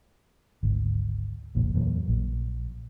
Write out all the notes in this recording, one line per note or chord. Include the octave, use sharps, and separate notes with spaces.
G#1 D2
F#1 B1 A#2 F3
E2 A#2 F#3
A#1